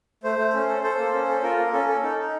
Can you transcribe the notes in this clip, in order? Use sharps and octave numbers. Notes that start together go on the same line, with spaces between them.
A3 C5
A3
C#4
A4
A4 C5
A#3
C#4
A4
F4 A#4
A#3
C#4 A4
A4
D#4
D#4